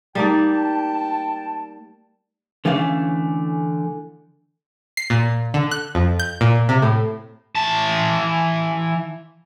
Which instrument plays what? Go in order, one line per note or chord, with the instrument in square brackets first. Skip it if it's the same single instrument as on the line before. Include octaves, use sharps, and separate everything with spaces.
[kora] G3 A#3 D5 [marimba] A3 D#4 [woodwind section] G5 A5
[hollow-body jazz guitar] D3 E3 A3 C#4 F5
[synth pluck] C7
A#2
D3
F#6
F2
G6
A#2
C3
A2
[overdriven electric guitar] E3 A5